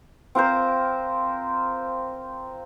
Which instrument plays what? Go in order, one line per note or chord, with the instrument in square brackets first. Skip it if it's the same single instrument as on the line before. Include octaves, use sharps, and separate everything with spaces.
[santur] C4 F4 A#4 C5